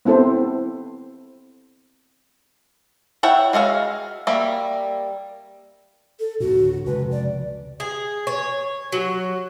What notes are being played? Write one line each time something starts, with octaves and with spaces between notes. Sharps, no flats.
B3 C4 E4 A4 C5
E4 C#5 E5 F#5 G5
G#3 F#4 E5 F5
G3 A#3 E5
A4
D2 A2 F#4
F1 C#2 C3 B4
D5
G#4
C#5
F#3